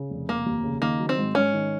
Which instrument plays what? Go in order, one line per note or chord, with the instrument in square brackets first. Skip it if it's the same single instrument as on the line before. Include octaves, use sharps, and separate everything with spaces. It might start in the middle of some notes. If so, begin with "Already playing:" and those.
Already playing: [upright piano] C#3
F1
[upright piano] F1 [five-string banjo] A#3
[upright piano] D#2
C#3
[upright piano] D#3 [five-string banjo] A#3
[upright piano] F#3
[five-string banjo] C4
[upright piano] G#2
[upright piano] G#2 [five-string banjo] C#4
[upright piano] D#3